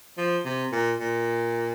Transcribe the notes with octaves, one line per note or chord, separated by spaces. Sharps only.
F3
C3
A#2
A#2